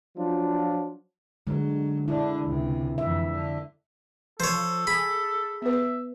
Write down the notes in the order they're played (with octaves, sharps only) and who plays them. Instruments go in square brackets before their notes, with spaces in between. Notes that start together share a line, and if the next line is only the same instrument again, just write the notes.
[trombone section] F3 F#3 D4 F4
[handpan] D3 G#3 [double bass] F#3
[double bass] D3 D4 [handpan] E4
[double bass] C#2 C3
[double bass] F2 E3 [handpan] E5
[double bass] D3
[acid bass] F3 [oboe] A4 [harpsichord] C5 C#5
[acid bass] G#4 [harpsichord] B5
[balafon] B3 B4 [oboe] E5